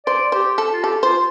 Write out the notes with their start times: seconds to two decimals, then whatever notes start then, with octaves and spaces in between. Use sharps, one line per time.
0.06 C5 D5
0.32 G4 C5
0.58 A4
0.73 F4
0.84 G4 A4
1.03 F4 C5